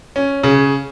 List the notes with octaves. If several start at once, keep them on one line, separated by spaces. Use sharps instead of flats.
C#4
C#3